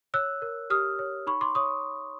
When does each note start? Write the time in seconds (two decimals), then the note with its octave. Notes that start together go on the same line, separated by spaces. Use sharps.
0.14 C#5 E6 F#6
0.42 A#4
0.70 G4 D#6 F6
0.99 C#5
1.27 D#4 B5 C#6
1.41 C6 D6
1.55 C#5 C#6 D#6